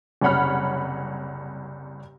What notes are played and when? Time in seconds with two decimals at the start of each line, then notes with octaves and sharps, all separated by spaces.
0.21 F#1 C2 C#5 F#5 B5 F6